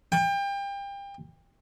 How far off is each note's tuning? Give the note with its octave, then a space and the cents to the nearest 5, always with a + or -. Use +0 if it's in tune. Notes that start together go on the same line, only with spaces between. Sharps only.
G5 +30